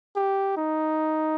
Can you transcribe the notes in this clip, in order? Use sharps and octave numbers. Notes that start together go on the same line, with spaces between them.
G4
D#4